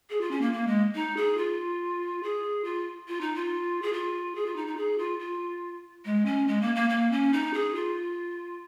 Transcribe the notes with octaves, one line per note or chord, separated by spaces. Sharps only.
G#4
F4
C#4
A#3
A#3
G#3
D#4
G#4
F4
G#4
F4
F4
D#4
F4
G#4
F4
G#4
F4
D#4
D#4
G#4
F4
F4
G#3
C#4
G#3
A#3
A#3
A#3
C#4
D#4
G#4
F4